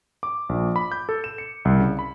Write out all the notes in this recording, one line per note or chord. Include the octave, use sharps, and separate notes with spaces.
D6
A#1
B5
G6
A4
E7
C#7
C2
C#3
B5